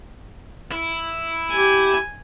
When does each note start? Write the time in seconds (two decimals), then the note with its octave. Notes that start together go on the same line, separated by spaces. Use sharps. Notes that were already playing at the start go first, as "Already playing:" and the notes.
0.72 E4
1.51 G4 G#5